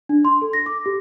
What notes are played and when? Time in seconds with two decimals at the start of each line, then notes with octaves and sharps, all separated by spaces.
0.09 D4
0.25 C6
0.42 A4
0.53 A#6
0.66 D6
0.86 G4